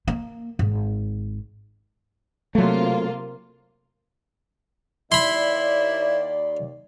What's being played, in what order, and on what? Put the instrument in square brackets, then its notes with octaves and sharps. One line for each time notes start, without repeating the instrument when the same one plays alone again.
[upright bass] A#3
G#1
[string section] C3 A#3 F4 [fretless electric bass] F#3 A3
[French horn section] D#2 D5 [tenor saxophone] E4 [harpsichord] B5 C6